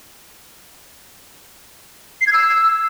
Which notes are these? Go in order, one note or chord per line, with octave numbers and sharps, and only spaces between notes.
C7
G#6
E6